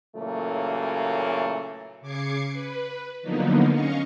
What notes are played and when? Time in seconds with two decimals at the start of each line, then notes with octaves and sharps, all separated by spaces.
0.15 A#2 C#3 E3 F#3 A3 A#3
2.01 C#3 D6 G#6 C7 C#7
2.52 B4
3.22 D3 F3 F#3 A#3 B3 D#4
3.72 C#4 D#5 F5 C#6